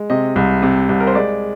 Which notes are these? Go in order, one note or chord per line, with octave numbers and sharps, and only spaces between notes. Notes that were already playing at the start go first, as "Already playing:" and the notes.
Already playing: G#3
C3 D#5
C2
C3
C2
A#4
C5
G#3 D5